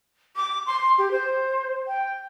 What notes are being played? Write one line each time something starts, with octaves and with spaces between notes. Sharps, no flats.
D6
C6
G4
C5
G5